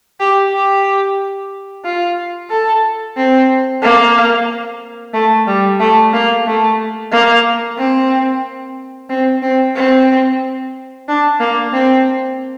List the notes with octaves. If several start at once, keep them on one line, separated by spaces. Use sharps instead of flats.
G4
G4
F4
A4
C4
A#3
A3
G3
A3
A#3
A3
A#3
C4
C4
C4
C4
D4
A#3
C4